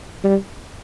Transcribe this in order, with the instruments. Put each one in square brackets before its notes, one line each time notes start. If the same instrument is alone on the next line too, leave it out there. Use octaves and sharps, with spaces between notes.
[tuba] G3